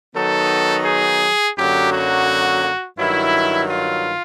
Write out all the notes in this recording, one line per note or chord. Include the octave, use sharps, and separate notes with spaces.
D#3 F#3 B3 D#4 A4
G#4
F#2 D3 F#3 A#3 G4
F#4
G2 D#3 F#3 E4
F4